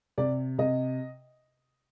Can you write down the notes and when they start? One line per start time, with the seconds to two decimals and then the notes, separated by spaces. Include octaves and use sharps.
0.18 C3 D5
0.58 C3 D#5